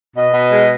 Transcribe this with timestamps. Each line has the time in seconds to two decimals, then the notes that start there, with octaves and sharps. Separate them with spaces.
0.16 B2 D#5
0.34 B2
0.51 G#3